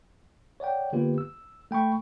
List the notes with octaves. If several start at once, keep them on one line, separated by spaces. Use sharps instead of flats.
C#5 D5 F#5 G5
D3 A#3 B3 F4 G4 B4
E6
A3 G5 B5 C#6